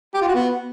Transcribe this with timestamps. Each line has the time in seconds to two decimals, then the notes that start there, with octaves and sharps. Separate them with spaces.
0.14 G4
0.21 F4
0.28 F#4
0.34 B3